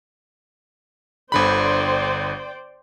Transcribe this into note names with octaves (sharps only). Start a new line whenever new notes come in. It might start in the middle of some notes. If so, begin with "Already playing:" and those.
G1 D3 C5 D5 G5 B5